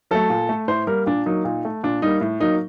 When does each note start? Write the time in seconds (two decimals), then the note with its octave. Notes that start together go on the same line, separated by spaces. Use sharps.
0.11 F#3 A3 A4
0.30 A#2
0.49 A3
0.68 A2 C5
0.87 G3 A#3 A#4
1.06 A#2 D4
1.26 F#3 A#3 D#4
1.45 A#2
1.65 A3
1.83 A#2 D4
2.02 G3 A#3 D#4
2.21 A2
2.40 F#3 A#3 D#4